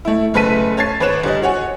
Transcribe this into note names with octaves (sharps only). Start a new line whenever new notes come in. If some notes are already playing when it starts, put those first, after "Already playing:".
A3 E4
F#1 A3 B4 A5 B6 D#7
C#5 A5 G#6 A6 C7
G#1 B4 C#5 F#6 E7
G1 G3 D#5
F#4 C#5 F#5 G#5